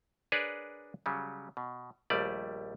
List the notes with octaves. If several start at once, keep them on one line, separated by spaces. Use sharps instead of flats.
D4 G#4 A#4 B4 C#5 D5
C#3 F#3 G3
B2
A#1 D#2 G3 A3 D5